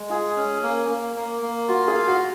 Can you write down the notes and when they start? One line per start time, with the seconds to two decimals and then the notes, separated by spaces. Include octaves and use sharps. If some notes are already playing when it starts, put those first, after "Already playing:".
Already playing: G#3
0.10 F4 G#4
0.37 C#4
0.63 A#3
0.90 A#3
1.16 A#3
1.42 A#3
1.68 F4 F#4
1.88 G#4
1.94 F5
2.08 F#4